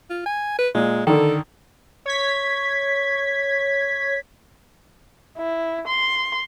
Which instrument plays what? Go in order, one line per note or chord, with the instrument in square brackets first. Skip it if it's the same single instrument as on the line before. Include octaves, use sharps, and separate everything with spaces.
[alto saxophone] F4
G#5
B4
[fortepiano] A#2 [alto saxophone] G#3
[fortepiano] D3 D#3 [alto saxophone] A4
[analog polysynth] C#5 G#6 B6
[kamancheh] E4
C6